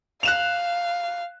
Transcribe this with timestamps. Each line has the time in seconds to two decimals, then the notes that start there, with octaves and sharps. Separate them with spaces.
0.23 F5 F#6 E7 F7